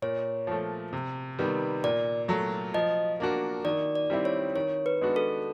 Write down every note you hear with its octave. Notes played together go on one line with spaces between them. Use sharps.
A#2 C#5
F3 A3
C3
D#3 G3 B3
A#2 D5
F#3 A3
F3 D#5
A#3 D4 F#4
D#3 D5
D5
G3 C4 E4
C#5
D#3 C#5
B4
G#3 B3 D4 F#4
A4